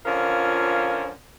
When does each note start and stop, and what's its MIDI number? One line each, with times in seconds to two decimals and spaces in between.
0.06 1.09 50
0.06 1.09 53
0.06 1.09 61
0.06 1.09 65
0.06 1.09 70